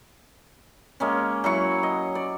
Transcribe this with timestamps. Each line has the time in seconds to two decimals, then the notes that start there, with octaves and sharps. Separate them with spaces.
1.00 G#3 A#3 C#4
1.44 F#3 E4 C#6
1.83 D#5
2.15 D5